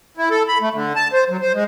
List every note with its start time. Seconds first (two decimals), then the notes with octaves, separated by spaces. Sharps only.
0.17 E4
0.31 A4
0.48 B5
0.61 A3
0.74 D3
0.96 A5
1.13 C5
1.30 F#3
1.41 C5
1.54 G#3